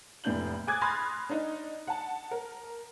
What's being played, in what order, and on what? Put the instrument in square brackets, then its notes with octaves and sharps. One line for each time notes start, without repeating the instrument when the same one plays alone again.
[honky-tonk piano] F1 A2 D4 G6 F#7
G#5 D6 D#6 F#6 G#6 A6
B5 C6 D#6 F6 A6 A#6
D4 D#4
F#5 A5
A#4